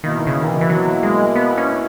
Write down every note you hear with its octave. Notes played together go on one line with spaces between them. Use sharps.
B2 D#3 A#3 E4
C#3
D#3
E3
E3
F#3
G#3
B3
C#4